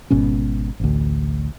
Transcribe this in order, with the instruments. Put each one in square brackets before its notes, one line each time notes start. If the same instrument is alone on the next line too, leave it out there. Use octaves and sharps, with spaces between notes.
[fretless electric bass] G#1 G#2 B2 C#4
A1 D2